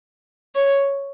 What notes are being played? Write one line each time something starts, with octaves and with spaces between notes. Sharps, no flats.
C#5